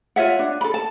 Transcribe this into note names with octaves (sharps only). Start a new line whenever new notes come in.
F4 C#5 E5 F#5
D4
A4 B5
A5